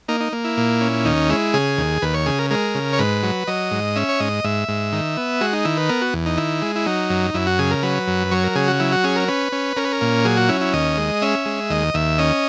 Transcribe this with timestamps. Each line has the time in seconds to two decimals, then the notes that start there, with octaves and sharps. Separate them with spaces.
0.08 A#3 D#4
0.20 D#4
0.33 A#3
0.44 E4
0.57 A#2
0.81 C#4
1.05 D#2 D#4
1.29 G#3 E4
1.54 C#3 G#4
1.78 D#2
2.02 D#2 B4
2.14 C#5
2.26 C#3 G#4
2.39 A#4
2.50 G#3 A#4
2.75 C#3
2.93 C#5
2.99 G#2 B4
3.23 F#3
3.47 F#3 D#5
3.71 G#2
3.96 C#4 E5
4.09 C#5
4.20 G#2 D#5
4.44 G#2 E5
4.68 G#2
4.92 D#3
5.17 B3
5.41 G#3 F#4
5.53 D#4
5.65 D#3 E4
5.77 B4
5.89 B3 A#4
6.01 F#4
6.13 E2
6.26 D#4
6.37 D#3 E4
6.62 G#3
6.76 E4
6.86 F#3 D#4
7.10 F#2
7.34 F#2 E4
7.47 F#4
7.59 C#3 G#4
7.71 A#4
7.83 F#3 B4
8.07 F#2
8.31 F#3 C#5
8.44 A#4
8.55 C#3 G#4
8.68 F#4
8.80 F#3 E4
8.92 F#4
9.04 C#4 G#4
9.16 A#4
9.28 C#4 B4
9.52 C#4
9.76 C#4 A#4
9.84 B4
9.93 A#4
10.01 A#2
10.25 F#3 G#4
10.37 F#4
10.49 C#4 E4
10.61 E4
10.73 D#2 D#5
10.97 G#3
11.22 C#4 E5
11.46 G#3
11.70 D#2 D#5
11.94 D#2 E5
12.18 C#4 D#5